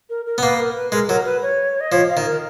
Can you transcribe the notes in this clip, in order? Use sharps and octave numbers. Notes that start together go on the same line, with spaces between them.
A#4
A#4
B3
A#3 B4
A#4
B4
G#3 A#4
F#3 A#4
B4
C#5
D#5
F3 C#5
F5
D#3
A#4